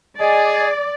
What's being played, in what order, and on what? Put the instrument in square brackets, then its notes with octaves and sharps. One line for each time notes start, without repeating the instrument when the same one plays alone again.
[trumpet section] G#4 G#5 [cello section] D5 [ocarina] D#5